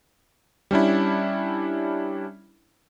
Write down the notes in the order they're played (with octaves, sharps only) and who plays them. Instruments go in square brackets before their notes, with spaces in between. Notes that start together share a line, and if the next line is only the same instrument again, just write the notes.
[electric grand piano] G3 C#4 D4 E4